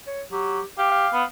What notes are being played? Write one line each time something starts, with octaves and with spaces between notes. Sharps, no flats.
C#5
F#3 G4
G4 F5
F5
B3